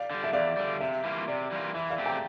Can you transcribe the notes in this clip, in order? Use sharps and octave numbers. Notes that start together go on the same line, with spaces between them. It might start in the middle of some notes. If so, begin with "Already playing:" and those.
Already playing: D5 F5
D3 G3
E5
E2 D5 F5
D3 G3
C3 E5
E3 G3 A#3 F4
C3 D5
E3 G3 A#3 F4
E3 E5
D5 F5
A3 C4 G4
G5 A#5